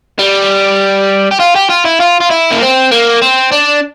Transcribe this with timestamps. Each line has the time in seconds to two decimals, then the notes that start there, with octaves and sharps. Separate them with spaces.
0.19 G3
1.31 G4
1.40 F4
1.55 G4
1.70 F4
1.85 E4
2.00 F4
2.20 F4
2.30 E4
2.51 A#3
2.61 C4
2.91 A#3
3.22 C4
3.52 D4